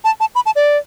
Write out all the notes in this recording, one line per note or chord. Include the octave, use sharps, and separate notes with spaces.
A5
A5
B5
A5
D5